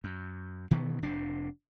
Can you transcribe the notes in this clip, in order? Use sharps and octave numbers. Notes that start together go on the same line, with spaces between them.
F#2
B2 D#3 E3 B3
F1 C3 D4